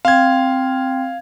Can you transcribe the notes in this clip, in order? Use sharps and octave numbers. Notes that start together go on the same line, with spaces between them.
C4 F5 G5 G#6